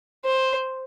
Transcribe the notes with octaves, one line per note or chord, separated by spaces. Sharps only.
C5